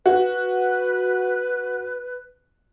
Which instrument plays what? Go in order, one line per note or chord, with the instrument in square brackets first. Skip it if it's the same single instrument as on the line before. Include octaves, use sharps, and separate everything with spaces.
[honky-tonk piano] F#4 [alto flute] B4